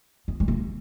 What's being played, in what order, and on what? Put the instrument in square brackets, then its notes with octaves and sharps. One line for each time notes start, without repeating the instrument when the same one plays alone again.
[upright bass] B3
G#3
A#3